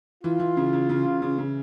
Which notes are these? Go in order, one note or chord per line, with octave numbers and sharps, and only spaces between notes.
E3 F4
E3
C#3
C#3
C#3
C#3
C#3
C#3